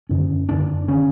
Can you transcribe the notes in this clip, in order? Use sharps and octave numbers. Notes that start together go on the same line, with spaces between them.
F#2 D3 C#4
F#2 D3 D4
D3 C#4